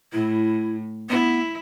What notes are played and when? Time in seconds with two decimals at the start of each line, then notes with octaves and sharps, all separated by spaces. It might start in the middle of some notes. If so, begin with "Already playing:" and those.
0.12 A2 E4
1.09 B3 E4